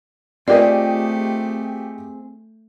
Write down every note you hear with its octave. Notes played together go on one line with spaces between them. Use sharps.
A3 C4 F4 G4 G#4 A#4 D5 D#5